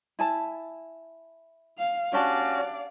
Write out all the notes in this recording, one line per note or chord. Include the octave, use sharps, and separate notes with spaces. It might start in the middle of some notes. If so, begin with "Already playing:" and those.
E4 G#5 A5
F5
C#4 D4 F#4 G4 D5 F5 A5